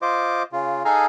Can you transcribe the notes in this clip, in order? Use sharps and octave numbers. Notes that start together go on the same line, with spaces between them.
F4 C5 D#5 D6
C#3 F4
D#4 G#4 A4 F5 G#5 A#5